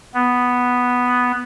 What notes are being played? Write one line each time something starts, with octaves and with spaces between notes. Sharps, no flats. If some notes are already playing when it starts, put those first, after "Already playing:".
B3